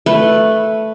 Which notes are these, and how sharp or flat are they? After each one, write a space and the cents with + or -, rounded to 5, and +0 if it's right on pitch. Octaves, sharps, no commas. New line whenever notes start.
A3 +0 B4 +0